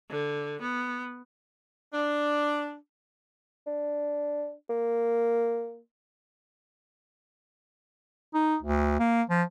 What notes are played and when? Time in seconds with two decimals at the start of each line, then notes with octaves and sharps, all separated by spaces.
0.10 D3
0.62 B3
1.94 D4
3.67 D4
4.70 A#3
8.34 D#4
8.62 D2
8.99 A#3
9.30 F3